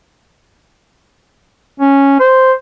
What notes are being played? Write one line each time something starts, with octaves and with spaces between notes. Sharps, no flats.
C#4
C5